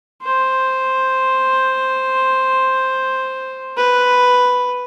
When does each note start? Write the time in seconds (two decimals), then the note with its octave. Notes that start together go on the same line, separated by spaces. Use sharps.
0.22 C5
3.77 B4